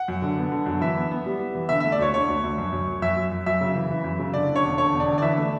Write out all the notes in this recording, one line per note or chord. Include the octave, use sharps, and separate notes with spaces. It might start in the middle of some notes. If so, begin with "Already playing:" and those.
Already playing: F#5
F#2
D3
B3
D3
F#2
E3 E5
B3
B3
G3
B3
E3
D3 E5
A3 E5
D5
D2 C#5
D3 C#5
D2
D2
F#2
F#2
F#2
F#2 E5
F#2
F#2
F#2 E5
C#3
E3
E3
F#2
C#3
D3 D5
D3
C#5
E1
D3 C#5
E1
D5
D3
D5
E3 E5
A3